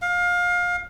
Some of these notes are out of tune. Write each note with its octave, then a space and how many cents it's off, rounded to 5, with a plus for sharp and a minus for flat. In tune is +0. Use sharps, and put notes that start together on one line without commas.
F5 +25